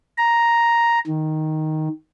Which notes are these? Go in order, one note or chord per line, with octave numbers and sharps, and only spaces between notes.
A#5
D#3